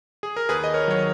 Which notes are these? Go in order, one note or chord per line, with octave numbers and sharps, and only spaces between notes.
G#4
A#4
D#2 G#4 B4
D#5
A#4 C#5
D#3 F#3 C#5